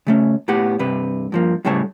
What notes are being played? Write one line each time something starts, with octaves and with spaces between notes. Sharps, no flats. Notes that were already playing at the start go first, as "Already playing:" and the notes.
C#3 A3 C#4
A2 B3 G4 F#5
G2 C3 B4
G2 F3 A#3
A2 C#3 G3 A3 C#5 A5